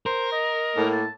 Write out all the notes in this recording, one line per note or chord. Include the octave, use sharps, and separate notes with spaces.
A#4 C5
D#5
A2 A#3
A5